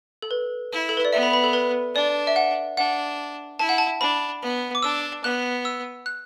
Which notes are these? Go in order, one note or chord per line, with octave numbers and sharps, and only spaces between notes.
A4
B4
E4
A4
B4
D5
B3 E5
B5
B5
A4
B4
D4 D5
E5
F#5
D4 F#5
E4 A5
F#5
A5
D4 B5
B3
D6
D4 E6
B3 F#6
E6
F#6